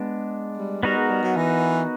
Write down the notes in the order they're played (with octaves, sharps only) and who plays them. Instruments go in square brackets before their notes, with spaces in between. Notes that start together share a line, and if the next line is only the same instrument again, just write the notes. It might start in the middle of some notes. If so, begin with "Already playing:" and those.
Already playing: [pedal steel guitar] G#3 B3 D4
[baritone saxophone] G3
[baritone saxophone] G3 [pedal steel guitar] B3 D#4 F#4 A#4
[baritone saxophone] G#3
G3
F#3
E3